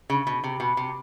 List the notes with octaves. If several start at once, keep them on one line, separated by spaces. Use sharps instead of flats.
C#3
B2
C3
B2
C3